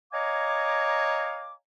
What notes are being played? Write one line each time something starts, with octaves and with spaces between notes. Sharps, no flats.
C#5 D#5 F5 G#5 A#5 D6